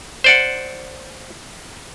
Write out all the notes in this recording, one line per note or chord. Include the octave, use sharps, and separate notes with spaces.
C5 D5 F#5